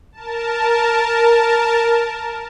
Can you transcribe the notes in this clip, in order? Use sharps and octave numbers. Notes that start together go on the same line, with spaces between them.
A#4 A5